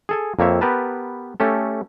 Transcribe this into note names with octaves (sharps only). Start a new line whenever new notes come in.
G#4 A4 G#5
F2 A#3 C4 C#5 E5
B3 G4 A#4 B4 A5
A3 C#4 G4 A4